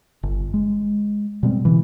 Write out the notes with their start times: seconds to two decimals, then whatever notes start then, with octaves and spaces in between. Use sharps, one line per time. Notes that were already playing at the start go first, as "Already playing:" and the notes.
0.23 G1
0.54 G#3
1.43 B2 G3 G#3 C4
1.65 C#3 E3